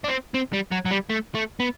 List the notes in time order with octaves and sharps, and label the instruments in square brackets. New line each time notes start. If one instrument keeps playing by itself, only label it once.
[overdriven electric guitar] D4
C4
C4
G3
F#3
F#3
G3
A3
A3
B3